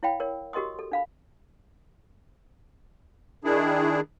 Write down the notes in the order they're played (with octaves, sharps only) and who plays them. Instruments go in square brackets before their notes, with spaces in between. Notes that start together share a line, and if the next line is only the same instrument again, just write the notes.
[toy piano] E4 C#5 F5 G5 B5
A#4 C#5
F#4 G4 A#4 D#5 C6 D#6
A4
D4 F5 B5
[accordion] D#3 D4 E4 G#4